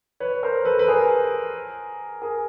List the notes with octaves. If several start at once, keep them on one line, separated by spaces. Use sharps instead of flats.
B4 C#5
A#4 C5
A4 B4
B4
G#4 A#4
G#4 A#4